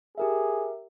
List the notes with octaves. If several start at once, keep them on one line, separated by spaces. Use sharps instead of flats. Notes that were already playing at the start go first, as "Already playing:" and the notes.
G4 G#4 A#4 E5